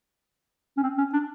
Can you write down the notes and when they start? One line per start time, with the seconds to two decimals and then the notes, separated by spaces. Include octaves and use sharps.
0.77 C#4
0.83 C4
0.98 C#4
1.13 D4